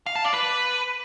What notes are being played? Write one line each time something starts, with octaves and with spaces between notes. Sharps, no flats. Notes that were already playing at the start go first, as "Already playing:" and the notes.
F5
A5
D5
B4